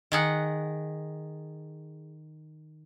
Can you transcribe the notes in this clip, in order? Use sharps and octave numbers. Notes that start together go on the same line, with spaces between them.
D#3 G#4 F#5